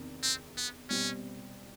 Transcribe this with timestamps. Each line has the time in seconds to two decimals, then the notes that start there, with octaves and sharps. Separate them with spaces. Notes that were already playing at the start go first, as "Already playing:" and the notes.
Already playing: E2 C3 D#3
0.23 C4
0.57 B3
0.89 B2 G3 C4 C#4